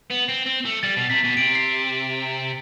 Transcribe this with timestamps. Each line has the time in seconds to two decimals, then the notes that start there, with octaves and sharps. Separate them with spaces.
0.11 B3
0.29 C4
0.46 C4
0.65 A3
0.83 G3 A6
0.97 B2
1.10 C3 B6
1.24 B2
1.37 C3 D7
1.55 C7